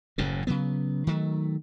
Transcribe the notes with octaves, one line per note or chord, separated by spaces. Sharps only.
F#1 F#2 A2 C#3
C#3 F#3 B3
D#3 F#3 A3